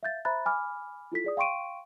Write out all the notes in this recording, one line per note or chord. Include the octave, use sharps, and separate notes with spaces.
E5 F5 G6 A6
C5 E5 A#5 B5 F#6 A6
G#5 B5 D6 F6
E4 F4 A4 B6
G#4 D5 D#6
F5 G5 C6 C#6 D7 D#7